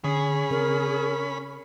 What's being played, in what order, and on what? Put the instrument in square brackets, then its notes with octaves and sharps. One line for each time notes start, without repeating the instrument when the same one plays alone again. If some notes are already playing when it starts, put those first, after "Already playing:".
[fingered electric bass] D3 [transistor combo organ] C#4 B5 [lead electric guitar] G#4
[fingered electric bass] C#3 C4 [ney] A#4